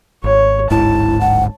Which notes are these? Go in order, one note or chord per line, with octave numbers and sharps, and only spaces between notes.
G#1 C#5
D1 G#1 G#2 E4 A5
F#5